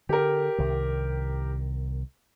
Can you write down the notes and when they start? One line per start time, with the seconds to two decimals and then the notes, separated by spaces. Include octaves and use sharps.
0.09 D3 G4 A#4
0.58 C2 D#3